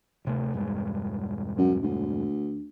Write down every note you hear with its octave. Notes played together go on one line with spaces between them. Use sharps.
D1 C3 A3
E1 G2 G#3
F#2
D2